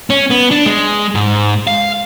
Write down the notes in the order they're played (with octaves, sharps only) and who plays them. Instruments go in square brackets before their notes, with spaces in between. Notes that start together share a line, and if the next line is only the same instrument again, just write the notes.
[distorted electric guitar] C#4
B3
D4
G#3
G#2
F5